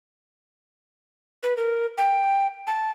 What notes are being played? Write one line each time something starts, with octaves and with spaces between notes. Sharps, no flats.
B4
A#4
G5
A5